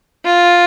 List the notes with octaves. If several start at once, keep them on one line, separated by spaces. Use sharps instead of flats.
F4